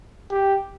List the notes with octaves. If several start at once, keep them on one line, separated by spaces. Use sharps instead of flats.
G4